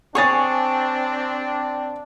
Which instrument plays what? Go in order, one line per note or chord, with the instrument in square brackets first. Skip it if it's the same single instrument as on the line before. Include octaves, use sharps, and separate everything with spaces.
[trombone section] C4 D4 [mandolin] G#4 C#5 [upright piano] C#6 A6